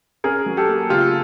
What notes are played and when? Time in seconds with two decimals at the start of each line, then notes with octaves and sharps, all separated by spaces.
0.24 C#4 G#4 A#4
0.46 F#3
0.57 G4 A4
0.68 A#3
0.89 C#3 F4 G4